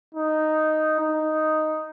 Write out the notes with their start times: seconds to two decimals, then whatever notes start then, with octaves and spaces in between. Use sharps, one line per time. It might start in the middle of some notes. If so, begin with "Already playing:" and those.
0.15 D#4
0.99 D#4